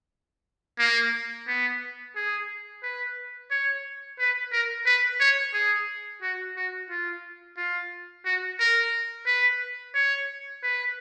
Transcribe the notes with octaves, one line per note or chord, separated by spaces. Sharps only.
A#3
B3
G#4
B4
C#5
B4
A#4
B4
C#5
G#4
F#4
F#4
F4
F4
F#4
A#4
B4
C#5
B4